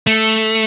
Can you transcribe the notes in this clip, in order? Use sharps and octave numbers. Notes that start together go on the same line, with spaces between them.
A3